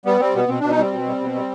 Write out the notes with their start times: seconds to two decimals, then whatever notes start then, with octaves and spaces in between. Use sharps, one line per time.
0.06 G3 B3
0.20 G3 C4
0.35 B2 B3
0.48 B2 C4
0.60 B2 D4
0.70 D#4
0.77 G3 C4
0.92 B2
1.07 G3
1.21 B2
1.35 G3